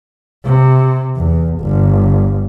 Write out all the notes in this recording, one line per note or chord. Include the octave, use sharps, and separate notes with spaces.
C3
E2
G1